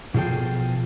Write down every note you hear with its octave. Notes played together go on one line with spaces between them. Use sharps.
B2 F3 G#4 A4 G5